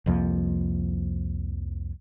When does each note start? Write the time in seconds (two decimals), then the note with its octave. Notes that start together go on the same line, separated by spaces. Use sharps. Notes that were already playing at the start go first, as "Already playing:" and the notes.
0.06 C2 F2 F3 A#3